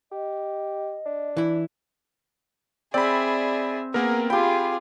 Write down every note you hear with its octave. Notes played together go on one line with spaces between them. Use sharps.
G4 D#5
D4
E3 E4
C4 G#4 D5 E5 B5
A#3 B3 G#4 A#4 F#5
F4 G4 G#4 G5 B5